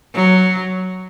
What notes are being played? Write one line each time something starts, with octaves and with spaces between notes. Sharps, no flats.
F#3